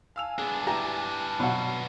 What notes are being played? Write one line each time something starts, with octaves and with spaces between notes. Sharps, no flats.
F5 G#5 A5 E6 F7
B3 D4 G#4
E4 G4 A#5
B2 F#3 F#5